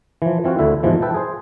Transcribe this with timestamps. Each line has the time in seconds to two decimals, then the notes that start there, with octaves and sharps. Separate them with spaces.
0.22 E3 F3
0.44 E3 C4 F4 F#4
0.59 D2 D3 E4 E5
0.83 G#2 B2 E3 F3
1.02 B4 E5 G5 A5
1.14 G#4 C5